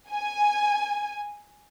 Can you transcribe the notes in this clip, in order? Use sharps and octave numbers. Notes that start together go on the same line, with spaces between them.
G#5